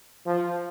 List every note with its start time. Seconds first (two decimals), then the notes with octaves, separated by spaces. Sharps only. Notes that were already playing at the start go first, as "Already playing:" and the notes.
0.26 F3